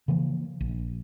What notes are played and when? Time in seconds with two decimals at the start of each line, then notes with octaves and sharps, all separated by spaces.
0.08 C#3 E3 F3 A#3
0.60 A#1